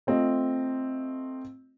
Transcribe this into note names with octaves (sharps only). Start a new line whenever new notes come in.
A3 C4 F4 D#5